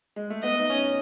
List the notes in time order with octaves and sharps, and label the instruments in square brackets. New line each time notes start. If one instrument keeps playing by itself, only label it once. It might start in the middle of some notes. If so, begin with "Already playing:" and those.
[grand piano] G#3
A3
[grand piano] B3 [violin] D#5
[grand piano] D#4
C#4